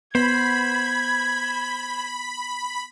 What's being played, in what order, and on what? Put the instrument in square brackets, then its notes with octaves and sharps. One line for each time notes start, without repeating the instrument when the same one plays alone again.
[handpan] B3 [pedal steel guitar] C5 [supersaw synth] B5 [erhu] G#6